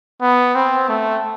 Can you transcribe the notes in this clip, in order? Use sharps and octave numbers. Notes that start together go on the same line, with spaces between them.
B3
C4
A3